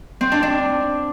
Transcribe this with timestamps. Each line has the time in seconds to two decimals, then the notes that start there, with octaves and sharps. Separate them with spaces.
0.21 C4
0.32 D4
0.43 D4